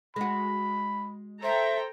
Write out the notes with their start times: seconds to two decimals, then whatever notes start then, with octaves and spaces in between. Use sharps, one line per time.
0.16 G#3 F#4 B5
1.43 A4 C5 E5 G5 A#5